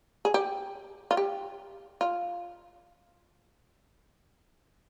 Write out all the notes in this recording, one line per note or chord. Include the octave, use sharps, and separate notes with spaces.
G#4
G4
F4
G4
F4